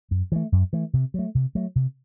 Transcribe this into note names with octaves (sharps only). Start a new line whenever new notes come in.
F#2
E3 A3
F#2
E3 A3
C3
F#3 A3
C3
F#3 A3
C3